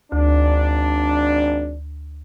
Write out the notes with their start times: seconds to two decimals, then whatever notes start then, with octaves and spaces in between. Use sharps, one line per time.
0.12 G#1 D2 D4